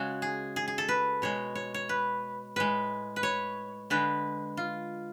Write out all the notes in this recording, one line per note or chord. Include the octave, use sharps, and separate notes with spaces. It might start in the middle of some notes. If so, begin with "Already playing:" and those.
Already playing: C#3 G#3 F#4
G#4
G#4
G#4
A4
B4
B2 G#3 C#5
C#5
C#5
B4
A2 G#3 B4
B4
C#5
D3 G#3 B4
F4